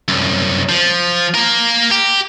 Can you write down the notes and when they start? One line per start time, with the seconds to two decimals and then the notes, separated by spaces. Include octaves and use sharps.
0.08 C2 F#2
0.69 F3
1.35 A#3 A#4
1.91 G4